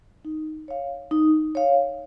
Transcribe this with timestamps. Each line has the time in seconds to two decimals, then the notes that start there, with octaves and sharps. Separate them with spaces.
0.25 D#4
0.68 C#5 F5
1.11 D#4
1.55 C#5 F5